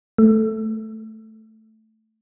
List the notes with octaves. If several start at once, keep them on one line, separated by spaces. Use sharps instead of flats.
A3